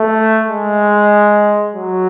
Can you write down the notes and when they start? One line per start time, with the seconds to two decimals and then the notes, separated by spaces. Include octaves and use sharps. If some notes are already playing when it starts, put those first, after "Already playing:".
Already playing: A3
0.48 G#3
1.74 F#3